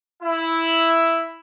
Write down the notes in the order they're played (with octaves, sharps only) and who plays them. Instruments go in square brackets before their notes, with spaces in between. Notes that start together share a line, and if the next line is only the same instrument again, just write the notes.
[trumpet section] E4